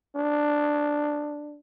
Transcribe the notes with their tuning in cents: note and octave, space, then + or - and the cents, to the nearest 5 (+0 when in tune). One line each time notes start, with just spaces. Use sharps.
D4 +5